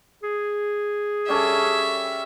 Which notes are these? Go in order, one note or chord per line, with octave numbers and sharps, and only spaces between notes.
G#4
G3 C#4 A4 E5